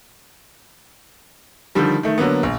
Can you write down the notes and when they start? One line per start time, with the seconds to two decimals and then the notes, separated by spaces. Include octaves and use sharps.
1.75 D3 D#3 F3 G3
2.03 D#3 A3
2.18 D3 F#3 A#3 B3
2.43 A#1